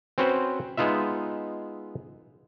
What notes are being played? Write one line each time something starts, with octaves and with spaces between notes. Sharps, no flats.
C4 C#4 F#4 B4 C5
G#3 B3 D#4 F4 E5